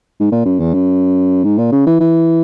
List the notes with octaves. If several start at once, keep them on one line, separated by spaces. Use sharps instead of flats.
G#2
A#2
F#2
E2
F#2
G#2
A#2
C#3
E3
E3